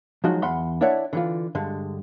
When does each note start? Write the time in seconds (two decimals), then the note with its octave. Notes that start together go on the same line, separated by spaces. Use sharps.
0.24 F3 F#3 G#3 D#4 F#4
0.42 E2 F#5 B5 C6
0.81 D4 E4 C#5 D5 E5 F#5
1.13 D3 E3 F4
1.55 G2 D3 G#3